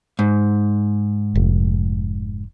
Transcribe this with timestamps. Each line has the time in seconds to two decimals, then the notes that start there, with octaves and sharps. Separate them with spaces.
0.19 G#2
1.35 F1